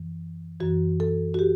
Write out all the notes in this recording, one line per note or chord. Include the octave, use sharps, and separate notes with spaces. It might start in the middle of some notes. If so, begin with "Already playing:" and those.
Already playing: F#2 E3
F#2 E3 F#4
A4
F#4
G4